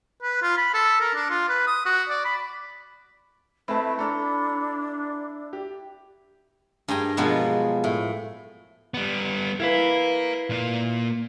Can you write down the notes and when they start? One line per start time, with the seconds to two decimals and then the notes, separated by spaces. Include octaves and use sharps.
0.22 B4
0.42 F4
0.57 B5
0.74 A4
1.01 A#4
1.15 D4
1.30 F4
1.49 B4
1.67 D#6
1.86 F#4
2.09 D5
2.25 B5
3.68 A3 C4 E4 B4 A5
3.99 D4 A4 A#5
5.53 G4
6.88 G2 G#4 G5 A#5
7.17 B2 F3 F#3 G#3 B3
7.84 A2
8.94 G3 B3
9.60 E4 A#4 B4 F5
10.50 A#2 A#3